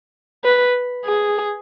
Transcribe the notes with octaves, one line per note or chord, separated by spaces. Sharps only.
B4
G#4